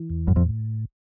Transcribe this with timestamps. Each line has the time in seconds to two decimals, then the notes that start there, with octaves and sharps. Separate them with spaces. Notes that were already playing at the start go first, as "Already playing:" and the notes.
Already playing: E3
0.10 E2
0.27 F#2 A2
0.36 F2
0.45 A2